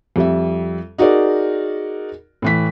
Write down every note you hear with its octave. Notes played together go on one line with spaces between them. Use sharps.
F2 G3 E5
D#4 F#4 G#4 A#4 D5
A2 E3 B6